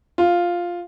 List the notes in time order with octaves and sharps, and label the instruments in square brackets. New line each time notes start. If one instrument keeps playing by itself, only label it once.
[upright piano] F4